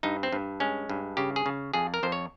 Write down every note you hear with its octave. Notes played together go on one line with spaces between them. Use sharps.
G2 D#4
C4
G2
G#3 C#4
G2
C#3 G4
G#4
C#3
F2 G#4
A#4
F2 C5
C#5